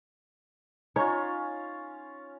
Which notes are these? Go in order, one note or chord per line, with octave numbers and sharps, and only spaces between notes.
C#4 D#4 F4 C#5